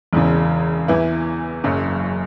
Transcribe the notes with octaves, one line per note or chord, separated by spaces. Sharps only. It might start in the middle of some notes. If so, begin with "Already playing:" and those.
E1 E2 C#3
E2 E3 B3 E4
F#1 F#2 C#3 F#3